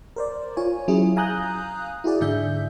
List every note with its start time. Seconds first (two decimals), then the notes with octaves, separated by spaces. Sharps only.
0.16 A#4 C5 D5
0.57 F4 C#5 G#5
0.88 F#3 C#4 E4 G#4
1.16 F5 G#5 A#5 D#6 F#6 G6
2.04 E4 F#4 G#4 D5
2.21 G#2 D3 D4 G#4 E5 G6